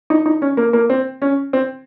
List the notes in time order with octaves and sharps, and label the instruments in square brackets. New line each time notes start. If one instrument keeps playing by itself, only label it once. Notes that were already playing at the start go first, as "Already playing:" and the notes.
[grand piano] D#4
D#4
C#4
A#3
A#3
C4
C#4
C4